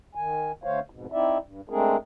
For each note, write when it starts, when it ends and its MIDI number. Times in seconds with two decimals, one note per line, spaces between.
0.15 0.52 51
0.15 0.52 80
0.64 0.80 50
0.64 0.80 57
0.64 0.80 72
0.64 0.80 73
0.64 0.80 77
0.90 1.07 41
0.90 1.07 44
0.90 1.07 47
1.12 1.38 60
1.12 1.38 63
1.12 1.38 64
1.12 1.38 74
1.12 1.38 76
1.43 1.61 43
1.70 1.97 56
1.70 1.97 57
1.70 1.97 60
1.70 1.97 62
1.70 1.97 68
1.70 1.97 70